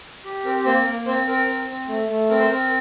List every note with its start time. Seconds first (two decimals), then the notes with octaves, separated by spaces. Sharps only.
0.25 G4
0.44 C4 A#4
0.65 A#3 C5
0.85 A#3 A#4
1.06 C4 C5
1.27 C4 A#4
1.47 C4
1.69 C4
1.88 A3
2.09 A3
2.30 C4 A#4
2.39 C5
2.49 C4 A#4